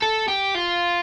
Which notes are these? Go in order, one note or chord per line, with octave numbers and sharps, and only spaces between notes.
A4
G4
F4